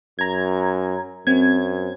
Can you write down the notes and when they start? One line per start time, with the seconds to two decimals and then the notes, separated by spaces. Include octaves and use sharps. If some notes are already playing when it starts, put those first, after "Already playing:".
0.19 F#2 A#5 G#6
1.27 F#2 C4 G#6